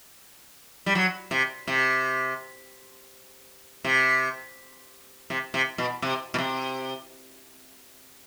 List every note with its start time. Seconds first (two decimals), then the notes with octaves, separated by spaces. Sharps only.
0.86 G3
0.95 F#3
1.31 C3
1.67 C3
3.85 C3
5.30 C3
5.54 C3
5.78 B2
6.02 C3
6.34 B2
6.39 C3